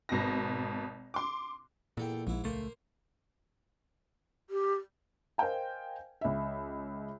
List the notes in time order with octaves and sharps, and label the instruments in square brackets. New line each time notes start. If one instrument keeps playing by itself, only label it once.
[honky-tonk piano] G#1 B2 A#6
C6 D6
[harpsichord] E2 A4 G5 [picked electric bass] A#2
[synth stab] A#1 [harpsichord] G#2 E4
[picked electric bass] C#2 A3 [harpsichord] A#3 C5
[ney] G4
[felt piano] A#4 C5 D#5 F5 G5 G#5
C#2 E5